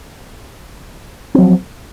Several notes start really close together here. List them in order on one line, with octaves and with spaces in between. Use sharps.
C4 F#3 F3